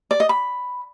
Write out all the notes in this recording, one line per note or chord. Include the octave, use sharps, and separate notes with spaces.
D5
D#5
B5